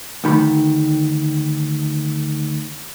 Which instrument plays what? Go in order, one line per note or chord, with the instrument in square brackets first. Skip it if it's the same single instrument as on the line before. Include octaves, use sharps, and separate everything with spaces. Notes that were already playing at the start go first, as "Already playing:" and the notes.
[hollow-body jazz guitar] D2 D#3 B5